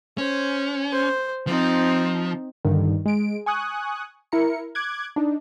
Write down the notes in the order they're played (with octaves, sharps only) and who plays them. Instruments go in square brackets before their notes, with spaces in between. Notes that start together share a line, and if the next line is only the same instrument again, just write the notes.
[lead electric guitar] C#4 [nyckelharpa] C5
[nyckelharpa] C5
[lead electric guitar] F3 [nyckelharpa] C4 D#4
[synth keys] G2 D3 D#3
G#3 D7
G#5 C#6 D#6 F#6
E4 A#4 C#7
D6 F#6 G#6
D4 D#4